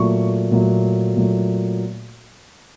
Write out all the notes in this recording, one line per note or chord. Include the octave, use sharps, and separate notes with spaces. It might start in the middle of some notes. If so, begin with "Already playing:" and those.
Already playing: A#2 F#3 A3 C#6
A#2 F#3 A3
A#2 F#3 A3